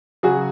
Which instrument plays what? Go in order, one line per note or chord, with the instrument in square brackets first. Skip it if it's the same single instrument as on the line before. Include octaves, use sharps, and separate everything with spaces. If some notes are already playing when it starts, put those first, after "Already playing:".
[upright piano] C#3 F#3 F#4 G#4